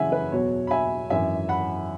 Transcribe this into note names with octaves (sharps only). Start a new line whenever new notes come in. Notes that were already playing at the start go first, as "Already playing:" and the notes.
Already playing: F#1 F#2 C#3 E3 E5 F#5 G#5
B4
E2 B2 F#3 C#5
B5
E5 G#5
G#1 F#2 E3 E5 G#5
F#5 B5